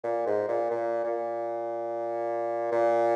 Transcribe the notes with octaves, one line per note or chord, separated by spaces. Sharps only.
A#2
G#2
A#2
A#2
A#2
A#2